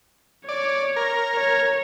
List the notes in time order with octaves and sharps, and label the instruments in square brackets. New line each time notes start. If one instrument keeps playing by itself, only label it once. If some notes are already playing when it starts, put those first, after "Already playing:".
[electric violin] C#5 [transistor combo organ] D5
[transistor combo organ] A#4
[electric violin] C#5